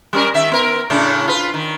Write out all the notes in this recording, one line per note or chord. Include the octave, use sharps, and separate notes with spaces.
G3 C#4 A#4
D#3 E5
B3 A#4
A2 C#3 D4
F4 B4
D#3